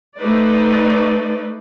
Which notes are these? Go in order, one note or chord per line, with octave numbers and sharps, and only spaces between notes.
A3 D#4 B4 C5 D5